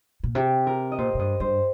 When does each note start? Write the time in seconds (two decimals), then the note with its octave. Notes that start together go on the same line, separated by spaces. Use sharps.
0.24 A#2
0.35 C3 G4
0.67 A#4
0.92 D#5
0.98 A#2 C5
1.15 A#2
1.19 G2 D#5
1.40 G2 C5